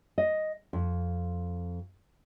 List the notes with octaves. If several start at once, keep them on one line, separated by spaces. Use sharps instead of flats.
D#5
F2